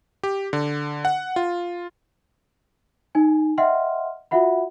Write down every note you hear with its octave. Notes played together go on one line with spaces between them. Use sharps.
G4
D3
F#5
F4
D#4 G#5
D#5 E5 F#5 G5 C6 F6
F4 F#4 E5 F#5 B5